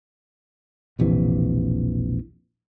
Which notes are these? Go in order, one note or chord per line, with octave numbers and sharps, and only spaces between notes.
E1 A#1 C3 E3